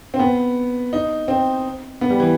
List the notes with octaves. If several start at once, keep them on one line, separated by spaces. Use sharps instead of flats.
C4
B3
D#4
C4
B3
G3
E3